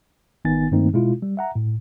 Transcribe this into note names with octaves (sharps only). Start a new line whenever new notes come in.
G#1 D#3 B3 D#4 G#5 A6
G2 D#3 A3 A#3 C4 D#4
B2 G#3 E4 F4
G3
E5 F#5 A#5
A2